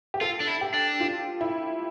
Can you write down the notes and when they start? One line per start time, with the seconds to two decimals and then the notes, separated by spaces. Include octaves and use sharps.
0.14 G4
0.21 F4 A4
0.40 D4
0.47 E4
0.61 G4
0.74 D4
1.00 F4
1.41 E4